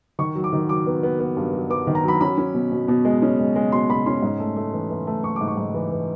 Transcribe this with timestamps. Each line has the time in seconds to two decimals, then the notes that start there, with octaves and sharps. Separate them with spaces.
0.19 D#3 C#6
0.35 F#3
0.44 D6
0.53 D#3
0.69 F#3 D6
0.86 B3
1.03 B3
1.20 B3
1.37 G2
1.53 F#3
1.70 B3 D6
1.87 D#3
1.95 A#5
2.04 F#3 B5
2.21 C#4 B5
2.38 C#4
2.54 B2
2.72 B2
2.88 B2
3.05 G#3
3.22 C#4
3.39 G#3
3.56 G#3
3.72 B2 C6
3.90 B2 B5
4.06 C#4 C6
4.22 G#2
4.40 A3
4.57 A3
4.74 E3
4.90 E3
5.07 A3
5.24 A3 C#6
5.36 G#2 D6
5.48 C#6
5.57 G#2
5.74 E3
5.91 E3